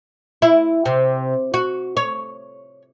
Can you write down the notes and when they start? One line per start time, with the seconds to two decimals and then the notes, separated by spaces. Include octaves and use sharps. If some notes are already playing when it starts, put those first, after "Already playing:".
0.42 E4
0.85 C3
1.54 F#4
1.97 C#5